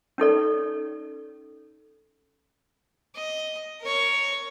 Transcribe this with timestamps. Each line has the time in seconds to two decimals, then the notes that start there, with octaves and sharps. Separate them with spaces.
0.18 C#4 D#4 A4 D5
3.15 D#5
3.81 A#4 C#5